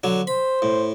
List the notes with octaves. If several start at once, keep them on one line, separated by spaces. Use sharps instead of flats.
D3 F#3
C5 B5
A2